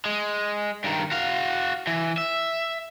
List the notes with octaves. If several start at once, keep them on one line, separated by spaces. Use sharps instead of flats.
G#3
G2 D#3
F#4 F5
E3
E5